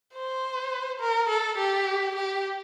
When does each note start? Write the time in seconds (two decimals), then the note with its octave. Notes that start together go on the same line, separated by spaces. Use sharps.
0.14 C5
1.00 A#4
1.29 A4
1.58 G4
2.16 G4